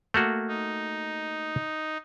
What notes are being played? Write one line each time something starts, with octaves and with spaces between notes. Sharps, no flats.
A3 A#3 F#4
D#4